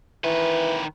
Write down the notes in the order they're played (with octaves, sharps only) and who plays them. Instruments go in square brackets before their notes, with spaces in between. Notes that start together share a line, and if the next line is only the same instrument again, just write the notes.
[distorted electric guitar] D#3 B4 [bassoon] E3